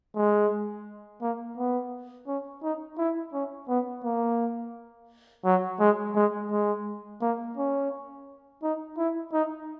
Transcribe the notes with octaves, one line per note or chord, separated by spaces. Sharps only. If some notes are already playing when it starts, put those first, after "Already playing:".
G#3
A#3
B3
C#4
D#4
E4
C#4
B3
A#3
F#3
G#3
G#3
G#3
A#3
C#4
D#4
E4
D#4